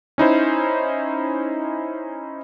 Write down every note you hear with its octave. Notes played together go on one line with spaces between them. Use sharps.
C#4 D#4 E4 C5